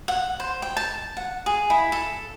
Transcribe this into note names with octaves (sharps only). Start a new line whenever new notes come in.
F#5
C5
G5
A5
F#5
G#4
E4
A4